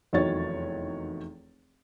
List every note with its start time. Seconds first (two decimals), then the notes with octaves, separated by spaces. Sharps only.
0.13 F1 E2 D#3 F#3 C#5 A6